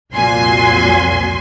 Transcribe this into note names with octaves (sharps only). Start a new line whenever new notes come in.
C2 F2 A#2 F#4 G#5 C6